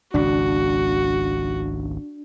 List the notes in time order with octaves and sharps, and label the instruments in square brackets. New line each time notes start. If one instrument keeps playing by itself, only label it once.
[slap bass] G#1 C#2 [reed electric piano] D4 [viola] F#4